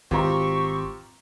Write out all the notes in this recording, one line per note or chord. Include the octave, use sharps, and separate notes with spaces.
G#1 C4 F4 G4 A#5 C#6